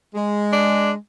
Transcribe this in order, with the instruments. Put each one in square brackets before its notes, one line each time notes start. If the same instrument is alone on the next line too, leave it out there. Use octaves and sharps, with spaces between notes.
[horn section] G#3
[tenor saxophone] D4